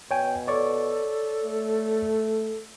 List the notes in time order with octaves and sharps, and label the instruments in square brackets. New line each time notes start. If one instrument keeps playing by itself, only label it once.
[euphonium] B2 [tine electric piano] C#5 G5 G#5
[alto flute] A4 [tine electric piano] C#5 D5 C#6
[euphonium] A3